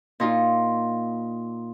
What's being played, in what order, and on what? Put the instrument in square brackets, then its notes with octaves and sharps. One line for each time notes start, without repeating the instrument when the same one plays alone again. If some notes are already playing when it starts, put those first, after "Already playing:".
[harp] A#2 D#4 F4